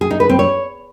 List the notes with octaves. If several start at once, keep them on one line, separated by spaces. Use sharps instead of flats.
G#4
D#4
B4
C4
C#5